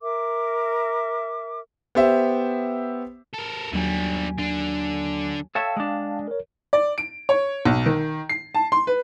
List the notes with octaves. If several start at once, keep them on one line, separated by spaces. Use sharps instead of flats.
A#4 E5 D6
B3 G4 C5 E5
A4 A#4
D#2 D3 F#3 G3 G#5
D3 D4
A4 C#5 E5 F5 G5 A5
G#3 D4
A#4 C#5
D5
D7
C#5
B1
D#3
C7
A5
C6
B4